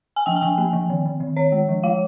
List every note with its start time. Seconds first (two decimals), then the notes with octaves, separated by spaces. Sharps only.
0.16 G#5
0.26 F3 G5
0.36 G#5
0.41 F3 G5
0.58 A#3
0.73 F3
0.90 D#3
1.05 D#3
1.20 D#3
1.36 D#3 C#5
1.52 G#3
1.69 F3
1.83 G#3 F5